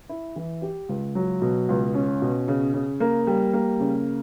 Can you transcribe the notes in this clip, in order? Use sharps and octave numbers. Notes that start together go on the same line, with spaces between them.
E4
E3
G4
C#2
F#3
B2
C#2
C#4
B2
C#3
C#3
A#3
G3
A#3
C#3